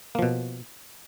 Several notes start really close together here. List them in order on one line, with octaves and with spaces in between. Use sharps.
A#3 F3 B2